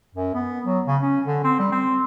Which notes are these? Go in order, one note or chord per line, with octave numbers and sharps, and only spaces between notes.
F#2
B3
F#3
C#3
C#4
D3
C4
G3
C4